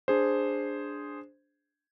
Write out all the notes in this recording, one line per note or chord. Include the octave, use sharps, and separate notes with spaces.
D4 G#4 C5